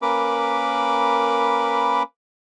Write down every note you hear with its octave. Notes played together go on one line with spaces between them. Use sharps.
A#3 C#4 A#4 B4 B5 D6